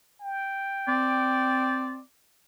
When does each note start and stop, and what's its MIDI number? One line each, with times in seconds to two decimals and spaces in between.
0.21 1.92 79
0.88 2.00 60
0.88 2.02 74